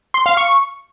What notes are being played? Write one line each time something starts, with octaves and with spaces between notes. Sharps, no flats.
C6
F5
C#6